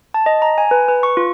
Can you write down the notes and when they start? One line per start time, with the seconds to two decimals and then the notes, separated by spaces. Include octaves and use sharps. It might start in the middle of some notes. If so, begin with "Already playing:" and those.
0.14 A5
0.26 D#5
0.42 A#5
0.58 G#5
0.71 B4
0.89 B4
1.03 C#6
1.17 F4